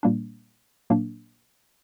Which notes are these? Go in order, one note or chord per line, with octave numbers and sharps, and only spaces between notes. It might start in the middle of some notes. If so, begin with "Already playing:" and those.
A#2 G3 A#3 D4
A#2 F#3 A#3 D4